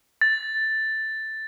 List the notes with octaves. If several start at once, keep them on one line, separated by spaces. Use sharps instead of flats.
A6